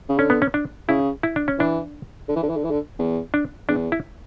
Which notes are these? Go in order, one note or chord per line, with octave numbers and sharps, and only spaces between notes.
C#3
D3 C#4
B3
C#4
D4
C#3 E4
E4
D4
C#4
E3 D4
D3
E3
D3
E3
D3
E3
D3
E2
D4
E2 D4
E4